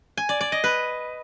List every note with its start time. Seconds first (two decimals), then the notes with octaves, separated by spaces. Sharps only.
0.17 G#5
0.29 D5
0.41 D5
0.52 D#5
0.64 B4